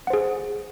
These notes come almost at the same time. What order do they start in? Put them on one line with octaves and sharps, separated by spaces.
F#5 C5 G#4